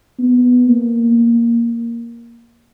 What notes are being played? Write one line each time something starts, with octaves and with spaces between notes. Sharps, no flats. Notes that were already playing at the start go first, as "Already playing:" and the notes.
B3
A#3